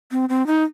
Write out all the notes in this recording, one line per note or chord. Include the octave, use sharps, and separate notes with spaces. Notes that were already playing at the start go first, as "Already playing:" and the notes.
C4
C4
D#4